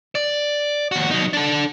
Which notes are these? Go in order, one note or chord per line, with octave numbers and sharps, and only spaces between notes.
D5
D#2 F#4
F#3 D#4
D4 A4